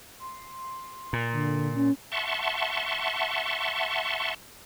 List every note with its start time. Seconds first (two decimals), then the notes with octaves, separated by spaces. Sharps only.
0.20 C6
1.13 A#2
1.33 D3
1.76 C#4
2.12 E5 F#5 A5 C6 C#6